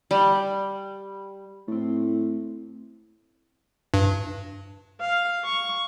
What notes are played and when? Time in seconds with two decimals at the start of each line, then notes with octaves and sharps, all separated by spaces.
0.11 G3
1.68 A2 A3 C4
3.94 G2
5.00 F5
5.45 C#6